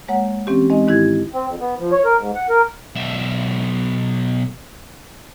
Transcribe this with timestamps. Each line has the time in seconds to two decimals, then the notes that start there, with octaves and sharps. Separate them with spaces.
0.08 G#3 A#3 C#5 F#5
0.47 E3 C4 C#4 G4
0.70 G#3 C4 D#4 D#5
0.87 G#2 D#3 E4 G4 G#6
1.33 C4
1.47 F2
1.60 B3
1.79 F3
1.92 C#5
2.05 A#4
2.18 G#2
2.35 F#5
2.50 A#4
2.96 B1 E5